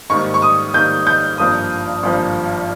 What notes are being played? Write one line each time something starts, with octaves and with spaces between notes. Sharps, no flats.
G#2 D#3 G3 A#3 C#6
C#6
D#6
G#2 D#3 G3 A#3 G6
G6
G#1 G2 F3 A#3 D#6
G#1 G2 F3 A#3